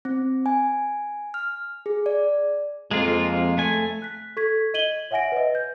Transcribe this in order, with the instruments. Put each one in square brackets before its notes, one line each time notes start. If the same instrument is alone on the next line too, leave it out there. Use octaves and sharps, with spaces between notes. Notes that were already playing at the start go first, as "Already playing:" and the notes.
[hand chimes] C4
G#5
F6
G#4
D5
[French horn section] F2 [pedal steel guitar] G#3 A#3 F4
[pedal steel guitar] A3 G#5
[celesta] F#6 B6
A4 C#6 G#6 B6
D#5 G#6 D#7 F#7 G7
C#5 E5 F#5 G#5 A#6 D7
B4 D#5
G6